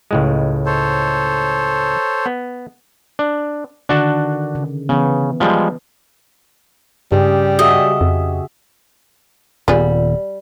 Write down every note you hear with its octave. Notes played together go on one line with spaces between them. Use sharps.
C#2 A2 G#3
A4 C5 C#5
B3
D4
D3 D#3 D4 F#4 A5
C#3
C#3 E3 B3
F3 G3 G#3
G2 C#3 G3 G4 G#4
F#4 G#4 D#5 E5
F2
D#1 G3 B3 F4 G#4